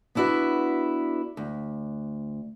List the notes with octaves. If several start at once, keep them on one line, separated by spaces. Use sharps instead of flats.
B3 D4 E4 F#4 B4
D2